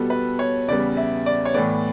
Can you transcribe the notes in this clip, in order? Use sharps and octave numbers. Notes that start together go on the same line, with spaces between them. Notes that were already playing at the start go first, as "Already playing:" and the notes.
Already playing: B2 G3 B3 A4
B4
C#5
E2 C#3 G3 B3 D5
E5
D5
C#5
A2 E3 B3 D5